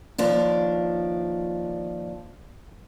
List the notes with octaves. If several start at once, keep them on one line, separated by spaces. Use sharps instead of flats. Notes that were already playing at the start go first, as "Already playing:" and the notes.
D#2 F3 D4